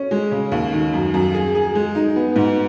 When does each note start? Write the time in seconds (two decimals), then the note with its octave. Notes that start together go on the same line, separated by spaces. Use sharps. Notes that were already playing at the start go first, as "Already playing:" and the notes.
Already playing: C#4
0.11 G#3
0.31 C#3
0.52 D#2
0.73 D#3
0.93 F#2
1.14 F#2
1.34 G#4
1.55 G#4
1.75 G#3
1.95 D#4
2.16 B3
2.36 G#2